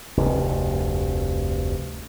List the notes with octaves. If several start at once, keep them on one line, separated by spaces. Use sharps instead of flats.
F1 D2 G2